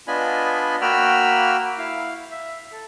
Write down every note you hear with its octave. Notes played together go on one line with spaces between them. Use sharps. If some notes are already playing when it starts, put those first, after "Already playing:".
B3 D4 F4 D#5 G#5 B5
A#3 F#4 G5 B5 E6 F6
E4 F5
E5
A4